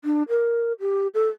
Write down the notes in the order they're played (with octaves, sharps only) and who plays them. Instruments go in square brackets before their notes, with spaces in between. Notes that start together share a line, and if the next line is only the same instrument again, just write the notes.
[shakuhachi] D4
A#4
G4
A4